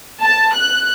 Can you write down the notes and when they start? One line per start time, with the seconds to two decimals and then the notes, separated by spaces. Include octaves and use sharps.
0.20 A5
0.55 F#6